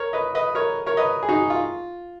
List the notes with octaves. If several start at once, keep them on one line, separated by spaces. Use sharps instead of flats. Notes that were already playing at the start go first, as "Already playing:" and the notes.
Already playing: A#4 C#5
B4 D#5
B4 D#5
A#4 C#5
A#4 C#5
B4 D#5
G#4
D#4 F#4
F4